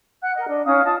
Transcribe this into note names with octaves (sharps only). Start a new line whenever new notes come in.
F#5 F#6
A#4 D#5 F#5
D4 D#5
C#4 D#4 F5 D#6
F4 D#5 A5 D#6